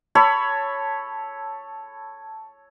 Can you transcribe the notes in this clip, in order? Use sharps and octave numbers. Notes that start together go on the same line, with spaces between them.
A4 C#5 B5